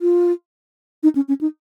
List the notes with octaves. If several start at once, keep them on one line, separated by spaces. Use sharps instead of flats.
F4
D#4
C#4
C#4
D#4